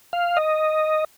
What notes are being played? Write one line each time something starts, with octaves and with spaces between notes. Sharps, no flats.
F5
D#5